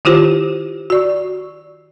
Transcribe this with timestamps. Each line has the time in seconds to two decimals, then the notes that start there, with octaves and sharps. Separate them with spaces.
0.05 D#3 E4 F4 G4 C5
0.90 F#4 D5 C#6